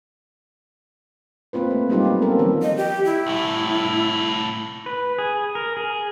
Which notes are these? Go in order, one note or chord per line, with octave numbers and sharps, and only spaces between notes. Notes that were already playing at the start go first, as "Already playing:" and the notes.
A#3 C4 F4 B4
A3
F#3 G3 D#4 F4 G4
A#3 B3
C4 C#4 A4 A#4
D#3 F3 G3
D#5
G4
E4
C2 A2
B4
G#4
A#4
G#4